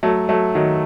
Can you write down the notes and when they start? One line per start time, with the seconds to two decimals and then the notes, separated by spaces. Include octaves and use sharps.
0.03 F#3 A3
0.29 F#3 A3
0.55 D#3 F#3